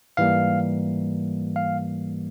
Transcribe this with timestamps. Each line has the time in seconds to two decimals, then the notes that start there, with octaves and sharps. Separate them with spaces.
0.17 G#2 E3 G3 A#3 F5
1.56 F5